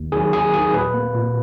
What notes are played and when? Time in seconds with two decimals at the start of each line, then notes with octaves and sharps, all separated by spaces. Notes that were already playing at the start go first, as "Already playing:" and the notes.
Already playing: D#2
0.12 D#3 F#3 G#4
0.33 D#2 G#4
0.53 D#3 F#3 G#4
0.74 A#2 B4
0.94 A#3
1.14 A#2